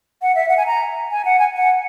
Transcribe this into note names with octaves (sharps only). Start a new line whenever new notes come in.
F#5
E5
F#5
G#5
A#5
G#5
F#5
G#5
F#5